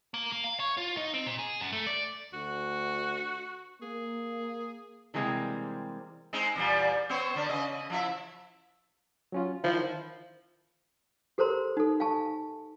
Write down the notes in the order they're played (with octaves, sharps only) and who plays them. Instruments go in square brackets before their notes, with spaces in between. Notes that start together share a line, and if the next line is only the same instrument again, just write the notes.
[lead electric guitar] A#3
A#3
F5
C#5
F4
D#4
C4
A#2
G#4
F#2
A3
D5
[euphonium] D2 [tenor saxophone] F#4
[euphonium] A#3 [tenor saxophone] G#4
[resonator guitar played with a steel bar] C3 E3 G3 G#3 A#3 C4
[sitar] G#3 C4 D#4
E2 A#2 G3
B3 C5 C#5
D3 D4
C#3 D#5
F3 E4 E5
[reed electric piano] F#3 C#4 F4
[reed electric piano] D#3 E4 [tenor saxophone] F3
[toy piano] G4 A4 A#4 C5 A#5 C6
D#4 A4
F5 G#5 A5 C#6